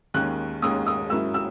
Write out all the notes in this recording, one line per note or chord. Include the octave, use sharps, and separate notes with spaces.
D#2 D#3 G#3 C#4 F#6
D#2 D#3 G#3 C#4 D#6
D#6
G#2 F#3 A#3 C#4 E4 E6
E6